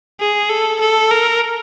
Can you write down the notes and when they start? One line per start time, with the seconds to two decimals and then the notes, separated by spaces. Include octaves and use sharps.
0.20 G#4
0.50 A4
0.80 A4
1.11 A#4